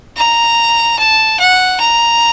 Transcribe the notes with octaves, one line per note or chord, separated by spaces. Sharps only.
A#5
A5
F#5
A#5